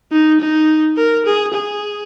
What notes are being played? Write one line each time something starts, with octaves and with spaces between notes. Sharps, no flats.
D#4
D#4
A#4
G#4
G#4